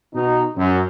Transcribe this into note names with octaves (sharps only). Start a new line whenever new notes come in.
B2 D#4
F#2